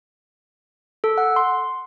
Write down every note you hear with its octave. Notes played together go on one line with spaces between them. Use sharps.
A4
F#5
C6